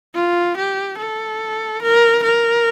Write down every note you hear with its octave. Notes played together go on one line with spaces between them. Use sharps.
F4
G4
A4
A#4
A#4